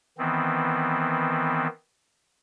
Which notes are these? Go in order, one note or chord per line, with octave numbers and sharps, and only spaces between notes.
D#3 E3 B3 C4